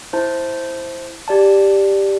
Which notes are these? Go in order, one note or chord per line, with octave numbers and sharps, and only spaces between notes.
E4 C5 A5
G4 D5 A5